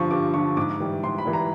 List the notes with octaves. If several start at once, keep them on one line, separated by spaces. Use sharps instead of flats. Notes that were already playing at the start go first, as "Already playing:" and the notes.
Already playing: G2 D3 F3 C#6
G2 D6
D3 F3 C#6
G#2 D6
E3 G3
G#2 C6
B5
E3 G3
A#5